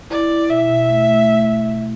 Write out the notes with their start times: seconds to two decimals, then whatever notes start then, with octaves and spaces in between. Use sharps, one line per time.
0.10 E4 D5
0.30 E4
0.50 B2 E5
0.69 B2
0.89 A3
1.09 A3
1.28 A3